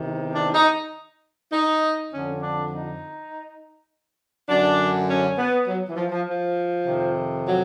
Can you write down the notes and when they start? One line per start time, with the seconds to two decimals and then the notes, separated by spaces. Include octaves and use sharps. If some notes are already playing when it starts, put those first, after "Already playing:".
Already playing: E2 C3 D#3
0.34 D4
0.54 D#4
1.52 D#4
2.11 F2 D3 C#4
2.41 D4
2.71 D#4
4.48 F#2 D3 D4
5.08 C#4
5.38 B3
5.68 F#3
5.89 E3
5.96 F3
6.12 F3
6.26 F3
6.86 F2 C3 D#3
7.46 F#3